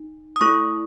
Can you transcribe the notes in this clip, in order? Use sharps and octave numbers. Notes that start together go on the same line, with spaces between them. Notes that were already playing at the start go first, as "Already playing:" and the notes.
Already playing: D#4
D#6
A3 E4 A4 C#6